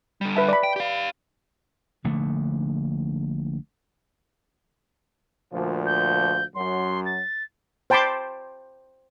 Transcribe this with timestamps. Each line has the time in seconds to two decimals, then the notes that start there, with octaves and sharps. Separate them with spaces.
0.21 D3 G3
0.35 B4 E5 A5
0.49 D5 B5
0.63 G5
0.76 G4 F5
2.04 A#1 D3 A3
5.52 D2 A#2 F3
5.86 G6
6.55 F#2 F#3 C6
7.05 A6
7.90 C5 G5 A5 B5 C6 D6